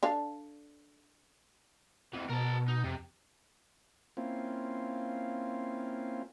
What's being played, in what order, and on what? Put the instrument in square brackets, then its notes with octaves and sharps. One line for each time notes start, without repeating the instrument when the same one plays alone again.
[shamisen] D4 A4 F5
[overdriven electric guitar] F2 E3
[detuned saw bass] B2 [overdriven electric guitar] A#4 A5
[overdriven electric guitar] D#4
[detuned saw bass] F2 [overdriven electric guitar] C3
[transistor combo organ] A#3 C4 C#4 E4 F4